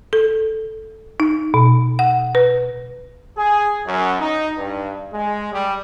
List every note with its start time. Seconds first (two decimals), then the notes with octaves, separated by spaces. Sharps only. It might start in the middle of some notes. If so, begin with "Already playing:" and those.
0.13 A4
1.20 D#4
1.54 B2
1.99 F#5
2.35 B4
3.38 G#4
3.87 F#2
4.20 D#4
4.57 G2
5.13 G#3
5.53 G3